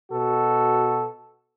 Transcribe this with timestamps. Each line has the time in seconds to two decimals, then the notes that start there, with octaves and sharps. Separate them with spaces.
0.12 B2 F#4 A4